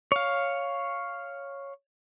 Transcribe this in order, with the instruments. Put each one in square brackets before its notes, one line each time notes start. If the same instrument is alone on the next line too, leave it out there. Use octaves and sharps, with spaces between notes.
[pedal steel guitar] C#5 F5